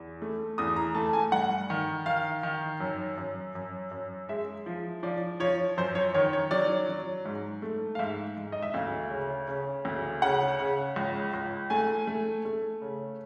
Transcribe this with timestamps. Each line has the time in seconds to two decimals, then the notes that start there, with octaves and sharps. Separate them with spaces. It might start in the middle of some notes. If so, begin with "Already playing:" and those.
Already playing: E2
0.22 A3
0.58 E2 D#6
0.76 A#5
0.95 A3 A5
1.13 G#5
1.32 G2 F#5
1.70 D#3
2.06 D#3 F5
2.43 D#3
2.80 F#2
3.18 F#2
3.55 F#2
3.91 F#2
4.29 G#3 E5
4.66 F3
5.03 F3 D5
5.40 F3 C#5
5.77 F#2 C5
5.95 C#5
6.14 D#3 C#5
6.33 C#5
6.51 F#3 D5
6.89 F#3
7.25 G#2
7.62 A3
7.95 F5
7.99 G#2 E5
8.37 G#2
8.52 D#5
8.62 E5
8.74 D2 F5
9.11 C#3
9.48 C#3
9.85 D2
10.22 C#3 F#5
10.59 C#3
10.96 C#2
11.33 C#2
11.70 A3 G#5
12.07 A3
12.45 A3
12.82 C#3